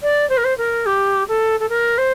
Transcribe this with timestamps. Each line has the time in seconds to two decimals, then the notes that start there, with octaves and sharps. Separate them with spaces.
0.02 D5
0.29 C5
0.37 A#4
0.44 C5
0.57 A#4
0.86 G4
1.28 A4
1.60 A4
1.69 A#4
1.98 C5